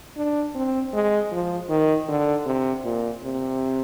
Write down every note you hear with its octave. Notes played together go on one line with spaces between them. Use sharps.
D4
C4
G#3
F3
D#3
D3
C3
A#2
C3